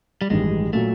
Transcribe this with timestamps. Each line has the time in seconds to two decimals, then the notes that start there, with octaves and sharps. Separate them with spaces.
0.22 G3
0.30 A1 G2 D#3 G#3
0.73 A#2 F#3 A3